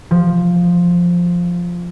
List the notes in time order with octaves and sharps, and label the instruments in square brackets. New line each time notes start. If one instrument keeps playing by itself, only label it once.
[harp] F3